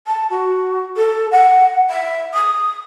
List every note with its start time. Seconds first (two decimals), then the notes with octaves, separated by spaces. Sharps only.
0.07 A5
0.30 F#4
0.97 A4
1.31 F#5
1.90 E5
2.34 D#6